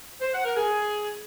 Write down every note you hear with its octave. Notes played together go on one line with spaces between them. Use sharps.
C5
F#5
A#4
G#4